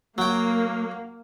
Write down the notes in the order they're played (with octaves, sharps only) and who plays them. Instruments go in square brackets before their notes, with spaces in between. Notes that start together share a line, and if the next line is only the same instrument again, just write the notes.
[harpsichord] F#3 G5 [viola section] A#3